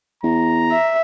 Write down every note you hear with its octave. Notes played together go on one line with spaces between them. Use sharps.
E2 A#5
E5